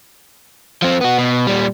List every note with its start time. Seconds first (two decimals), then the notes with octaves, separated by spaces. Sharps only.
0.82 F3 C4
1.01 B3 F#4
1.18 B2
1.47 A#2 G3